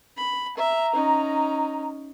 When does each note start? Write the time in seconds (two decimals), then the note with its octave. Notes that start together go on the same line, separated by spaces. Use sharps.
0.17 B5
0.57 E5 A#5
0.94 C#4 D#4